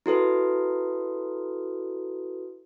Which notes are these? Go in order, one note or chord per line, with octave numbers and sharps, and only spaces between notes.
E4 F#4 A4 B4